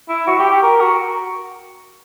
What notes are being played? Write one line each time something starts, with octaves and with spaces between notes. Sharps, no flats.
E4
F#4
G4
G4
A#4
F#4